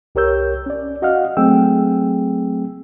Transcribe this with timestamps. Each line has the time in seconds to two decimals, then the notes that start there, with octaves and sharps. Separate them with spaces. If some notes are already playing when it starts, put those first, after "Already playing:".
0.15 C2 G4 A#4 C#5 E6 G6
0.66 C#4 D5
1.02 F#4 D#5 F5 F#5 F6
1.37 F#3 A3 C4 G#4 G5 E6